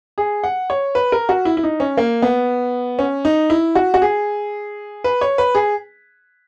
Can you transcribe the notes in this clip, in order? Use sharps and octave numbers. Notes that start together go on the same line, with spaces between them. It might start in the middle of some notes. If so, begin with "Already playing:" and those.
G#4
F#5
C#5
B4
A#4
F#4
E4
E4
D#4
C#4
A#3
B3
C#4
D#4
E4
F#4
F#4
G#4
B4
C#5
B4
G#4